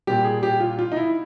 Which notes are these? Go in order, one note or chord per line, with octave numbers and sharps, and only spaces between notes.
A#2 G3 G4
G#4
G4
F4
F4
D#4
E4